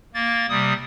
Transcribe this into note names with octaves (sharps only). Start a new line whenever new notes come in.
A#3 A6
C3 G3 D#6